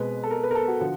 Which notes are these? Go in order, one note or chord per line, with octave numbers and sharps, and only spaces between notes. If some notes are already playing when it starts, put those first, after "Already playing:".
Already playing: B2 G#3 C4 B4
A4
A#4
B4
A#4
A4
F#4
D3 F3 F#4